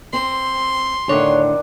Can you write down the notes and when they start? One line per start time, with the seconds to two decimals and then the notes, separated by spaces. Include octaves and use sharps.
0.13 C4 C6
1.09 A2 D3 D#3 D4 C#5